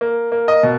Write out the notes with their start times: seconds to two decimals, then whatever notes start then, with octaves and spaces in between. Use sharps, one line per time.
0.01 A#3
0.32 A#3
0.48 D#5
0.63 B2